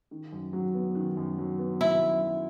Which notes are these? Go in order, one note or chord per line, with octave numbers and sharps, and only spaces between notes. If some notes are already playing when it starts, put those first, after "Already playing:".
D#3
F#2
F#3
B3
D#3
F#2
F#3
B3
D#3 E4
F#2
F#3